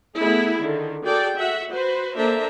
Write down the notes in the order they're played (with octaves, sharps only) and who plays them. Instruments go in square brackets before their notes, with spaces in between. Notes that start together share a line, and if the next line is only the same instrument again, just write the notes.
[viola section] A3 B3 E4 G#4
D3 D#3
F#4 G#4 A4 D5 G5
F#4 E5 F#5
F#4 B4 C5
A#3 D4 A4 C5 E5 A#5